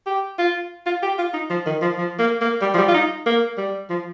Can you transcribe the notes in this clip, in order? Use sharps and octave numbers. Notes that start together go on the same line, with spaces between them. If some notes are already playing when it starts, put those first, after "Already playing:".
G4
F4
F4
G4
F4
D#4
F3
D#3
F3
F3
A#3
A#3
G3
F3
G3
F4
D#4
A#3
G3
F3